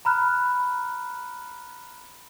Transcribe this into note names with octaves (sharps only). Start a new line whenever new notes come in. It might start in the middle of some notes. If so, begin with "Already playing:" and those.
A#5 B5 F6 F#6